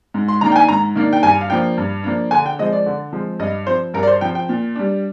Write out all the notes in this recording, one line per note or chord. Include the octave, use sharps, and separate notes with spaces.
G#2
C6
D#3 A#3 D4 A#5
G5
G#5
G#2 A#5
D#3 A#3 D4
G5
G2 G#5
F5
F3 A#3 D4 G5
G2
F3 A#3 D4
D3 G#5
G5
F3 G#3 C4 D#5
D5
D3
F3 G#3 C4
G2 D#5
F3 C4 C5
G2 A#4
D5
C5
F3 C4 G5
G5
A#2
G3 D4